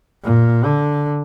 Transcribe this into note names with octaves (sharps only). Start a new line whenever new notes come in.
A#2
D3